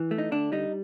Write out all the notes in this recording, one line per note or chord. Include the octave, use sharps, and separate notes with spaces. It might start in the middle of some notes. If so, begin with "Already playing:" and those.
Already playing: E3
A3
D#4
D3 D4
G3 D#4